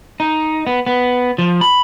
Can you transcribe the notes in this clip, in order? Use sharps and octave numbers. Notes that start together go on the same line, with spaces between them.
D#4
B3
B3
F3
B5